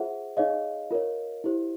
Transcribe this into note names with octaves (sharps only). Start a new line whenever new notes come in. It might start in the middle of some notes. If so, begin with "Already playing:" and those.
Already playing: F4 G#4 C5 E5 F#5
D#4 G#4 C#5 D#5 F5
F4 A#4 C#5
E4 G4 C5